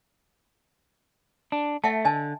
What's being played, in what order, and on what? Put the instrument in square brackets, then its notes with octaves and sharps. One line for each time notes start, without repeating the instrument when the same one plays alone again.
[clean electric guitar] D4
[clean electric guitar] A3 [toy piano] E5 F#5 A5
[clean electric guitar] D3 [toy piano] D#5 G#5 A5